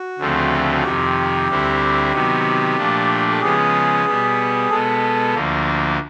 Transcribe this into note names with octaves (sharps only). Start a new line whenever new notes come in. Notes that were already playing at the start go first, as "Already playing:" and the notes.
Already playing: F#4
D2 C#3 F3 A3 C4
F2 C3 D#3 G4
D2 D3 G3 C4 E4
C3 D#3 F#3 B3
A#2 F3 A3 D4
A4
C#3 F3 G#3 B3 G#4
B2 G3 B3
B2 G#3 B3 A4
D2 D3 F3 A#3